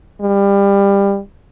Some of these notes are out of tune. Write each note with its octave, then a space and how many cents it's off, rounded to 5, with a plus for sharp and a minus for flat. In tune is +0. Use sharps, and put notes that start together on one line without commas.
G3 +25